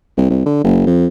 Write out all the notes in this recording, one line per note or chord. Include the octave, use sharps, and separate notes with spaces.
C2
C2
D3
F#1
F2